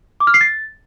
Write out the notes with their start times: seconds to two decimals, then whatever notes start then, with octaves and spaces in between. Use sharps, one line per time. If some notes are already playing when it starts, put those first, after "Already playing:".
0.20 D6
0.27 F6
0.34 C7
0.41 A6